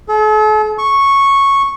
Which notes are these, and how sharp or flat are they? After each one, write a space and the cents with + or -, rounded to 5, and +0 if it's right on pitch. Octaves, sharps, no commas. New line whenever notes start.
A4 -45
C#6 -5